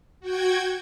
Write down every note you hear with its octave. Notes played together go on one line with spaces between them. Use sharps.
F#4 G5 G#6